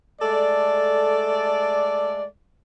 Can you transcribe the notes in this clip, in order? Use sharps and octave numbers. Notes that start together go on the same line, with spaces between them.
G#3 A3 A4 D5